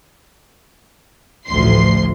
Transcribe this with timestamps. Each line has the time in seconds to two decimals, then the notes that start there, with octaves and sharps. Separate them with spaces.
1.47 A1 D2 F3 C6 C7